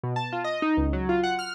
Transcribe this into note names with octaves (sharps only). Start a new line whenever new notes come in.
B2
A5
F4
D#5
D#4
C#2
F#3
F4
F#5
F6